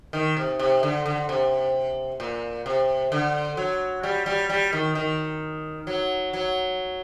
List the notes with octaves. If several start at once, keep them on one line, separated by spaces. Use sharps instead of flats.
D#3
C3
C3
D3
D3
C3
A#2
C3
D3
F#3
G3
G3
G3
D#3
D#3
F#3
F#3